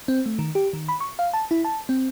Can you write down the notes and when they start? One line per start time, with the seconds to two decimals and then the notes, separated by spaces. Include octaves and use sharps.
0.08 C4
0.26 A3
0.39 D#3
0.55 G4
0.73 D#3
0.89 B5
1.00 C#6
1.19 F5
1.33 A5
1.51 E4
1.65 A5
1.89 C4